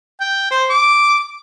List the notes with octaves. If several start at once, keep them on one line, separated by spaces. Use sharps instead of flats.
G5
C5
D6